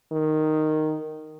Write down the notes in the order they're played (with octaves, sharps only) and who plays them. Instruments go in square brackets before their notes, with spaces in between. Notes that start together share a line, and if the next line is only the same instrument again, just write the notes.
[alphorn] D#3